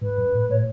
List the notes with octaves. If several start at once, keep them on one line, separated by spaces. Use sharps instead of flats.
G#2 B4
F#2
A2
A2 C#5